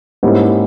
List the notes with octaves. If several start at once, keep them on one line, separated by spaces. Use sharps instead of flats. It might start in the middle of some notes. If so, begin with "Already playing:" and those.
G#2 G3 A#3 C#4 E4